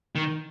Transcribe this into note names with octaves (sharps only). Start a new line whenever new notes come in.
D#3